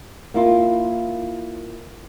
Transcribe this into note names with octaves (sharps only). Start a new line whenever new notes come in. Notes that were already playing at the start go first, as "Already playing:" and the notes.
A#3 E4 F4